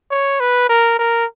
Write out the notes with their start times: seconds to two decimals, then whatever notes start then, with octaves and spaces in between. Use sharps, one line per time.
0.11 C#5
0.40 B4
0.69 A#4
0.99 A#4